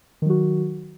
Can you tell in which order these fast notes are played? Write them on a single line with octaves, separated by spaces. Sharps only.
D#3 F#3 F#4